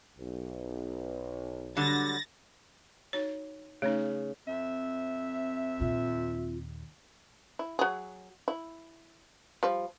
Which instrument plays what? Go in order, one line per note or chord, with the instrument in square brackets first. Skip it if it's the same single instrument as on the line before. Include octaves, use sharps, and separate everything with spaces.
[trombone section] B1
[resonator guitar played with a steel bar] D3 F#3 G3 [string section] A6 A#6
[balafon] D#4 F#4 C#5
[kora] C#3 [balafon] A3 C#4 D#4
[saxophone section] F2 E5 [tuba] C4
[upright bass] D#2 A#2 [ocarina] F4
[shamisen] E4
F#3 G#4
E4
F3 G3